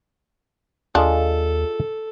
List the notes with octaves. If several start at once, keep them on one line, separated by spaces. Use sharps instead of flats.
D#2 D4 F4 G#4 A4 D#5